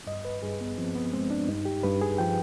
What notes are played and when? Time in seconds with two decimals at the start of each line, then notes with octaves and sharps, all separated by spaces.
0.07 G2 D#5
0.25 B4
0.43 G2 G#4
0.61 B3
0.78 F3 C4
0.95 B3
1.13 G#3 C4
1.31 D4
1.48 G2 D#4
1.65 G4
1.83 G2 B4
2.02 G#4
2.18 F3 G5